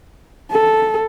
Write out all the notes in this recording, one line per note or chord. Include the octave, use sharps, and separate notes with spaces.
A4